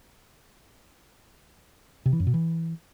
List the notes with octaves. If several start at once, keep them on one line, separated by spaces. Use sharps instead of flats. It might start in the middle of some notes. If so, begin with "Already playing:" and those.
C3
E3
F#2
B2
E3